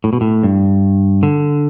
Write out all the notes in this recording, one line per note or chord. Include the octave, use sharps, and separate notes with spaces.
A2
B2
A2
G2
D3